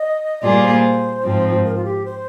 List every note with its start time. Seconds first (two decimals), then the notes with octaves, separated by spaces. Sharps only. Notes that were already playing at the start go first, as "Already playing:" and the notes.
Already playing: D#5
0.42 A#2 G3 A#3 F4 G#4 D5
0.62 C5
1.23 G#2 F3 C4
1.64 A#4
1.75 F4
1.85 G4
2.05 C5